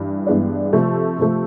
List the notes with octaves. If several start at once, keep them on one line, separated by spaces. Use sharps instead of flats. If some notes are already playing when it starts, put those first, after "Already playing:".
Already playing: G2 E3
G2 E3 G#3 B3 D4
C3 F3 A3
C3 F3 A3